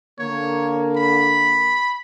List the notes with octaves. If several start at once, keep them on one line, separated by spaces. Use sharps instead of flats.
D3 A#3 C#5
B5